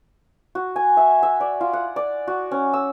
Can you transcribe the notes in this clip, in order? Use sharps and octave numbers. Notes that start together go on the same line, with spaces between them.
F#4
G#5
E5
E5
D5
F4
F#5
D5
F#4
C#4
E6